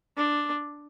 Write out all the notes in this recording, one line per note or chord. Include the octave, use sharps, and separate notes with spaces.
D4